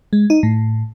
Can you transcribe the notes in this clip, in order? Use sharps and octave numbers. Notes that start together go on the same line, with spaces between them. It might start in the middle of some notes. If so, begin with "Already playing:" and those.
G#3
D#4
A2